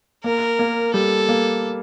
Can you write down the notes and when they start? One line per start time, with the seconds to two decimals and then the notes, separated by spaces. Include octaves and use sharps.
0.24 A#3 A#4
0.59 A#3
0.94 G3 A4
1.29 A#3